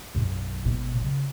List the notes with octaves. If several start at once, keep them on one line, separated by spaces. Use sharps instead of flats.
B1 F#2
G#1 B2
C#3